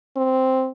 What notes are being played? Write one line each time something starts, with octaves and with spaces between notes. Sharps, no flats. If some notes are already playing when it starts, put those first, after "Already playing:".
C4